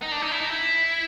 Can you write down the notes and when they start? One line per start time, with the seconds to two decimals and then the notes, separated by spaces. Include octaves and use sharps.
0.02 D#4
0.12 D4
0.22 D#4
0.31 E4
0.41 D#4
0.51 E4